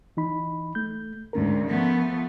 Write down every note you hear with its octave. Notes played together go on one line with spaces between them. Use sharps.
E3 D#4 B5
A3 G6
D2 G#2 C#4 A#4
F3 A3 B3